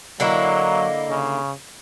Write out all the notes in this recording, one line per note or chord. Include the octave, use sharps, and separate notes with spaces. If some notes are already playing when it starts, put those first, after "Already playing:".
D3 F#3 A#3 E4 D#5
C#3